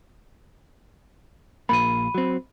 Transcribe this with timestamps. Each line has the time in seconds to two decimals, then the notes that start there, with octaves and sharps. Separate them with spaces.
1.69 A#1 A#3 B5 D#7
2.14 F#3 C4